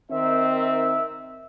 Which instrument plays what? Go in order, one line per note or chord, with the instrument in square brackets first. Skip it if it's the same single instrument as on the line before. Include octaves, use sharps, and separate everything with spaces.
[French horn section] D#3 C4 [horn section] A#4 E5